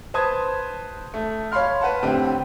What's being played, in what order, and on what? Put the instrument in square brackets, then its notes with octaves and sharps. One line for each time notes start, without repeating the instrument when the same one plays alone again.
[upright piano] B4 C5 A5 D#6 G#6
A3
C#5 F5 B5 C6 F6
B4 F#5 A5
A2 D3 C4 G4